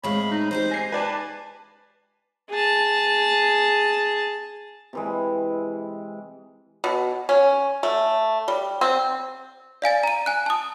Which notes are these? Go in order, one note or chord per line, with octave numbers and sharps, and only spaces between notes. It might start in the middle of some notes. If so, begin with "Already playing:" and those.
A2 G#3 C4 C#5 F5 B5
D#4
G#3 D#4 G4 C5
G#5 A#6 C7
B4 D5 G#5 A5
G#4 A5
C3 E3 G#3
B2
C#4
A3
G3
C4
D5 F5 G#5 A6
A#5 D#7
G#5 F#6
A5 D#6